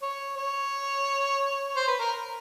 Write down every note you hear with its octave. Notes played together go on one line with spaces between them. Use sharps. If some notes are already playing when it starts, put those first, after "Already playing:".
C#5
C#5
C5
B4
A#4